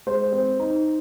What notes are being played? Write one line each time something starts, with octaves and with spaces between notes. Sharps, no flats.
G#3 C5
C4
D#4